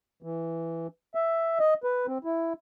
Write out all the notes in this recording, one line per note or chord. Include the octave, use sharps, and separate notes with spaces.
E3
E5
D#5
B4
C4
E4